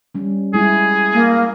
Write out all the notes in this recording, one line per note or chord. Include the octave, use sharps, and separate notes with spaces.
G3 C#4
G3 G#3 E4 G#4
A#3